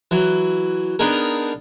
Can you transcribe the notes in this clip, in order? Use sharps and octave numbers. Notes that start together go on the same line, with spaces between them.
E3 F#3
B3 D4 D#4 G#4 A#4